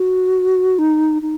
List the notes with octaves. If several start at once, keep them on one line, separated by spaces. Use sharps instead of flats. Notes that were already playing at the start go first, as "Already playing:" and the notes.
Already playing: F#4
D#4
D#4